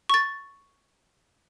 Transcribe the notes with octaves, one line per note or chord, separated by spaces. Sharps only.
C#6 A6